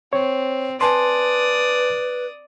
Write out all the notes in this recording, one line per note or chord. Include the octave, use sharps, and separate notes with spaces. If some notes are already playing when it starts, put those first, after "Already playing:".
C4 C#5
B4 D5 G#5 A5 C6 D#6